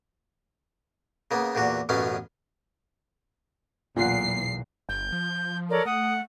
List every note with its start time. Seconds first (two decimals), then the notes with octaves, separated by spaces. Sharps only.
1.31 C#3 A#3 B3
1.55 E2 A#2 D3 F#4
1.89 A1 F#2 B2 A3 C#4 F5
3.96 B1 E2 A#2 F4 F#5 C7
4.89 G1 G6
5.12 F3
5.70 A4 A#4 C#5 D5
5.85 A3 F#5 D#6